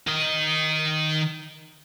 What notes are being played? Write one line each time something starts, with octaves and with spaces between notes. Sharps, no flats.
D#3 D#5